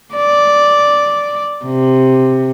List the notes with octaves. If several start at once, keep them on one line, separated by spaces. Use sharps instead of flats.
D5
C3